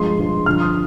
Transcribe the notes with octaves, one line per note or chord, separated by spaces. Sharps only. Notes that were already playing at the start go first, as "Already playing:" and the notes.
Already playing: G2 F3 G#3 C6
G2 F3 G#3
G2 D3 F3 F6
D#6